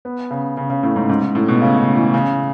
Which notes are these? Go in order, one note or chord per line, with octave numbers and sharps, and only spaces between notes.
B3
C#3
C#3
C#3
A2
G#2
G#2
G#2
A2
B2
C#3
C#3
E3
C#3